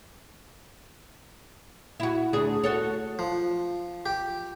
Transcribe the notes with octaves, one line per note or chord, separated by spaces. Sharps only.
E4 F#4
D2 D4 G#4
F#4 A4 C#5
F3
G4